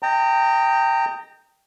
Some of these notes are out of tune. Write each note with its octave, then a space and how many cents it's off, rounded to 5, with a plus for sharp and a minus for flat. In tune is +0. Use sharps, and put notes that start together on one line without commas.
D#5 +5 G5 +0 A#5 -35